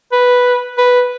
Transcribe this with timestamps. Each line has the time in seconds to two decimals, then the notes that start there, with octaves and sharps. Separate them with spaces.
0.12 B4
0.78 B4